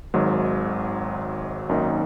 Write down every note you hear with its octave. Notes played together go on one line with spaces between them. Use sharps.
G#1 G#2 D#3 F#3
G#1 F#2 D#3 A#3 D#4